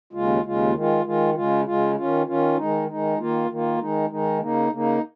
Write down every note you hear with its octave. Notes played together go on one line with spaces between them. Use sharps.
D#2 C#3 G#3 F4
D#2 C#3 G#3 F4
D#3 G#3 F4
D#3 G#3 F4
C#3 G#3 F4
C#3 G#3 F4
D#3 C#4 F4
D#3 C#4 F4
D#3 G#3 D#4
D#3 G#3 D#4
D#3 A#3 F4
D#3 A#3 F4
D#3 G#3 D#4
D#3 G#3 D#4
C#3 A#3 D#4
C#3 A#3 D#4